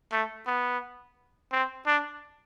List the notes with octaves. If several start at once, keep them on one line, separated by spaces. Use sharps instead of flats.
A3
B3
C4
D4